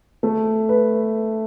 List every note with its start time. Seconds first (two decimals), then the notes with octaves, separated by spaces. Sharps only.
0.23 A3
0.69 B4